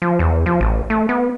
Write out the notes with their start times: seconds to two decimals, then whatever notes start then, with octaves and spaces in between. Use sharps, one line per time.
0.02 F3
0.19 E2
0.46 F3
0.61 A1
0.90 A3
1.09 B3